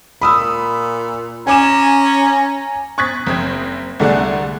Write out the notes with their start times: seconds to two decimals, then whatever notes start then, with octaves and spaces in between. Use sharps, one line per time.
0.22 A#2 B5 D#6 E6
1.47 C#4 G#5 A#5 D6 E7
2.98 C#6 D#6 F#6 G#6 A6 B6
3.26 F#1 C4 G#6
4.00 C2 D3 A3 G#4 D5 F#5